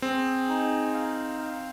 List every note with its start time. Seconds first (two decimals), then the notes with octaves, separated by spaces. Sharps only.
0.02 C4 G#4
0.48 D#4
0.94 F5
1.39 F5